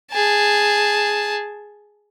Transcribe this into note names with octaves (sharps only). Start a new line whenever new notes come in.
G#4 A5